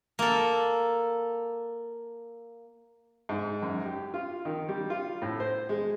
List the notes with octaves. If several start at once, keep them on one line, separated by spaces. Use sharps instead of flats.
A#3 A4
G#2
F#2
G4
F4
D#3
G3
F4
A2
C5
G#3